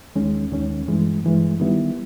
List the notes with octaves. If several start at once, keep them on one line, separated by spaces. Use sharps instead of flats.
D#2 D#3 G#3 C#4
D#2 D#3 G#3 C#4
G2 E3 G#3
G2 E3 G#3
D#3 G3 B3 E4